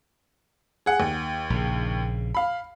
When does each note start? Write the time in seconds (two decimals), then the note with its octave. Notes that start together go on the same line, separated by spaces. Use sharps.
0.86 G#4 F#5
1.00 D#2
1.50 A#1 C#3
2.35 F5 B5